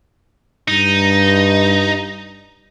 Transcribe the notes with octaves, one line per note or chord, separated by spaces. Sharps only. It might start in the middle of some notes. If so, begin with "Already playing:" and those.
G2 D#4